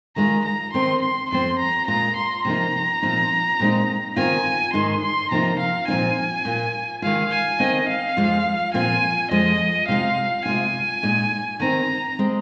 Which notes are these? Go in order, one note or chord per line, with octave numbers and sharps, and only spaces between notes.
D#3 G#3 F4 A#5
A#5
D#3 C4 D#4 C6
C6
F2 F3 C4 C6
A#5
A#2 G#3 F4 A#5
C6
C3 F3 A#3 D#4 A#5
A#2 F3 C4 D#4
A#2 G#3 C4 D#4
D#3 C4 F4 G#5
G#2 D#3 G#3 D#4 C6
C6
C3 F3 A#3 D#4 A#5
F5
A#2 F3 C4 D#4 G#5
A#2 A#3 F4
D#3 G#3 F4 F5
G#5
D#3 C4 D#4 D#5
F5
F2 F3 G#3 F4
A#2 F3 C4 F4 G#5
F2 F3 G#3 D#5
C3 G#3 F4 F5
C3 G#3 F4 G#5
A#2 G#3 D#4
D#3 C4 D#4 A#5
G#3 C4